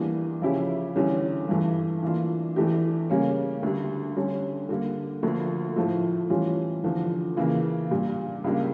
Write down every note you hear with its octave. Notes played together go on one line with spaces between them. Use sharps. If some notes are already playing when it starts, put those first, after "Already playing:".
Already playing: E2 E3 G3 A#3 D4
C#3 F3 C#4 E4 G4
E2 D3 G3 C#4
G2 E3 A3
E3 A#3 D4 F4
E2 E3 A3 D4 G4
C#3 G3 A#3 C#4
D2 D3 G3
D3 G3 C#4
D3 G3 A#3
D2 D3 F3 A#3
A2 F3 A3
E3 G3 C#4 F4
E2 D3 F3
C#3 E3 A#3
A#2 G3 D4
C#2 C#3 G3 A#3 D4